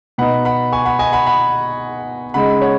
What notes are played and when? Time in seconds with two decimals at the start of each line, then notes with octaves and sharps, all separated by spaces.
0.18 B2 B3 D#4 F#5 B5
0.45 F#5 B5
0.72 G#5 C#6
0.85 F#5 B5
0.99 D#5 G#5
1.13 F#5 B5
1.26 F#5 B5
2.34 C#3 G#3 D#4 F#5 B5
2.62 C#5 F#5